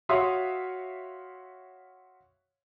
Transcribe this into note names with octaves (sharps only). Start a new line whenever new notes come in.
F#4 C#5 E5 F5 C6 D#6